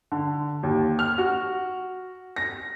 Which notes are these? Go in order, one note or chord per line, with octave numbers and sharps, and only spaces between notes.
D3
D#2
F6
F#4
A#6